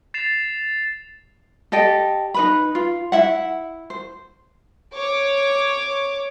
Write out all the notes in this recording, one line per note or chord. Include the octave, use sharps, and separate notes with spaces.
A6 C7 E7 F7
G4 A4 D#5 G5
D#4 B4 B5
F4
E4 E5 F#5
C5
C#5 D6